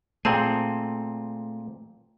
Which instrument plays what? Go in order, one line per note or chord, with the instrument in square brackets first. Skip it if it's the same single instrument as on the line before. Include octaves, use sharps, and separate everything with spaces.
[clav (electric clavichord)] A#2 C4 G#4 [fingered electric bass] A3 [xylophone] G5 A5